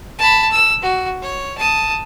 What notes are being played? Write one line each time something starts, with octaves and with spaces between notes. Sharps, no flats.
A5 B5
E6
F#4
C#5
A5 D#6